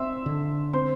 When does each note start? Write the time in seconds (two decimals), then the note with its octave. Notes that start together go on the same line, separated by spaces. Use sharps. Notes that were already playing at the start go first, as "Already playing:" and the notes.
Already playing: C4 E5 C6 E6
0.26 D3
0.73 C4 C5 C6